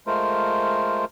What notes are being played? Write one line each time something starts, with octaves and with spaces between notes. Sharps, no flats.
G#3 A3 F4 A#4 C5